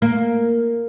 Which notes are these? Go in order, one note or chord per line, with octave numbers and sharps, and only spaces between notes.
A#3